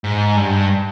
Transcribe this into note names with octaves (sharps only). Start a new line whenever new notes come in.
G#2
G2